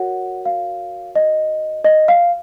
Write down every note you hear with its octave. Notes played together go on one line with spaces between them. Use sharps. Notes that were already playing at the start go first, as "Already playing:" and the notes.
Already playing: F#4 A#4 C#5 F#5
F5
D#5
D#5
F5